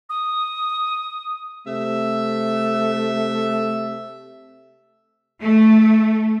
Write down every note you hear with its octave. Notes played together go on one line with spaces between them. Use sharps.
D#6
C3 A3 E5
A3